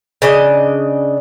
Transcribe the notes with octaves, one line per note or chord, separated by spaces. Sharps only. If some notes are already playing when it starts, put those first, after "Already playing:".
C#3 D4 D#5